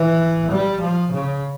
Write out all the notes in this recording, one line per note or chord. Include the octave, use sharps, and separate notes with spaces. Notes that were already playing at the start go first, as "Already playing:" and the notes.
Already playing: E3
G3
F3
C#3